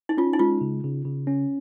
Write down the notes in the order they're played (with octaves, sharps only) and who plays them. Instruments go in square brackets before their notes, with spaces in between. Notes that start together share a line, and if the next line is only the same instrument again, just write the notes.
[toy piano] D#4
[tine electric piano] C#4 [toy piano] F4
[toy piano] D#4
[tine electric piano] G#3 [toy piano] F4
[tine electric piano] C#3
C#3
C#3
C#4